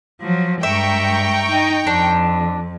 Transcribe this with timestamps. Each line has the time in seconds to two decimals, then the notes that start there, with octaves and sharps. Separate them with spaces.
0.21 F3 F#3
0.63 G2 G#3 E5 G5 A#5 C#6
1.50 D#4
1.87 F2 D4